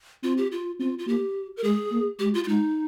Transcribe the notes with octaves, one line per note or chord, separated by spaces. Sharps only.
C4 F4
G4
F4
C4 F4
F4
A#3 G4
A#4
G#3 G#4
A#3
G#3 G4
F4
F4
G#3 D#4